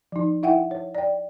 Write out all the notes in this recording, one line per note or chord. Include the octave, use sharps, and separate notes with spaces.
F3 D#4
E4 E5 F#5 G5
C#5
D5 G5